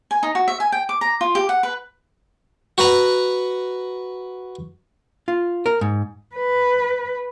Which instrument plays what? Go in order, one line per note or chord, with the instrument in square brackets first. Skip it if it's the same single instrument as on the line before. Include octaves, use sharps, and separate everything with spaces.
[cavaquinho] G#5
D#4
F#4
E5
G#5
G5
D6
A#5
F4
G4
F#5
B4
[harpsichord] F#4 B4 F#5 A#5
[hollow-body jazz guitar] F4
A#4
G#2
[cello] B4